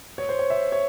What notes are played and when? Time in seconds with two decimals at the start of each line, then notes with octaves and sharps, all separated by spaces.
0.18 C#5
0.29 C5
0.39 C#5
0.50 E5
0.72 C#5